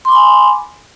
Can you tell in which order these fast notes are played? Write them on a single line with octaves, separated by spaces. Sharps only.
C6 D6 B5 G#5